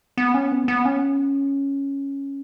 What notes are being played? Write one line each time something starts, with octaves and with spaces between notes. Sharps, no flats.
B3
C#4
B3
B3
C#4